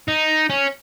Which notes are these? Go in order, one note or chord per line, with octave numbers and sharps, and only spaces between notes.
D#4
C#4